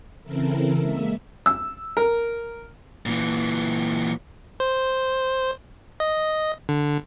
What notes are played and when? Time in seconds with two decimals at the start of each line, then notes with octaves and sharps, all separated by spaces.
0.24 C#3 E3 C4 E4 A4 A#4
0.80 G#3 A#3 E5
1.46 E6
1.97 A#4
3.06 A#2 E3
4.60 C5
6.00 D#5
6.69 D3